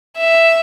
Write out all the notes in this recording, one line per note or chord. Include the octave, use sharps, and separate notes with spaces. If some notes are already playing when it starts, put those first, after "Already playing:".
E5